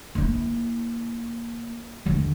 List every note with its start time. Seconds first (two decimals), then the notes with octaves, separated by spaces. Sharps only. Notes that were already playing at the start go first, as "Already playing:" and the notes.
0.15 A#3 E4
2.06 D#2 D3